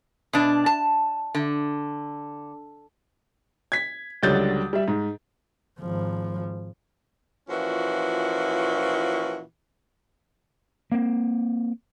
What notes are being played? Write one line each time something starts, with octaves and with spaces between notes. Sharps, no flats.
B2 D4
A5
D3
G#6 B6
C#2 D3 F#3 G3 G6 A6
G3 E5
G#2
G#1 F3
A#2 E3 F3 C#4 F#4
A#3 C4